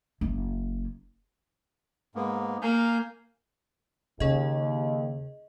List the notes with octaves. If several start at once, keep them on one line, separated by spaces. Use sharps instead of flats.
F#1
G#2 A#3 B3
A#3 F5 G#5 G6
D#2 C#3 G#4 D#5